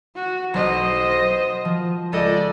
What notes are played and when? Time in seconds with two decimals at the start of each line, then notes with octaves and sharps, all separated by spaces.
0.15 F#4
0.54 B1 C5 D#5
1.11 A#6
1.65 F3
2.13 C#2 A4 D5 D#5